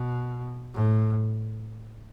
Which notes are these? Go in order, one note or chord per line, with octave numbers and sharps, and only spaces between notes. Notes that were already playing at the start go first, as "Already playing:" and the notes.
Already playing: B2
A2